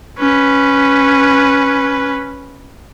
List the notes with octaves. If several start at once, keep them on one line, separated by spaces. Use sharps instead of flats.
C#4 B4